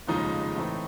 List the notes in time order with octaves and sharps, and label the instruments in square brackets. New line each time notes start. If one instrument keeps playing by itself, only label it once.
[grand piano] F1 D#2 C#3 F3 G#3 D#4 D#5
A2 E3 A3 C4 D#4